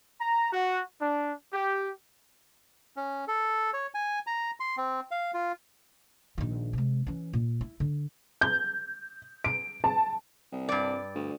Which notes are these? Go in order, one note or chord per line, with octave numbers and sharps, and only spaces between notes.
A#5
F#4
D4
G4
C#4
A4
C#5
G#5
A#5
C6
C4
F5
F4
A#1 D#3
C3 G#3
E3 C#4
A#2
E4
D3
G6
D7
A5
C2
G2 D5
D2